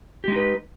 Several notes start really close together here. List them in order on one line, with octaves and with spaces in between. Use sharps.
G4 G#3 D#4 B4